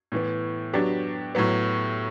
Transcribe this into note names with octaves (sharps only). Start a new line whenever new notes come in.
A2 E3 B3
F#3 B3 D4 G4
A2 F#3 B3